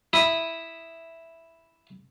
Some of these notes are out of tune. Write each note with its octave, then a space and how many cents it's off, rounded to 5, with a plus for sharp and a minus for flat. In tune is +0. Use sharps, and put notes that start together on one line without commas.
E4 +0 B5 +0 D#6 +0